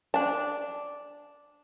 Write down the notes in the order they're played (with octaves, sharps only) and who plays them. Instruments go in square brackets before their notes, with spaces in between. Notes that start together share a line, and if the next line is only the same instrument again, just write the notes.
[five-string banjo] D4 A5